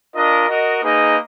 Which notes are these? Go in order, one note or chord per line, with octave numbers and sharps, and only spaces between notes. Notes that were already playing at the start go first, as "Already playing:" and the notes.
D4 F4 A#4 D#5
F#4 A#4 D#5
A#3 D#4 G#4 B4 D#5